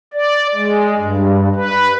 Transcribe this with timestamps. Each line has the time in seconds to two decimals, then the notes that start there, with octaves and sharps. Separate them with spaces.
0.13 D5
0.54 G#3
0.97 G2
1.55 B4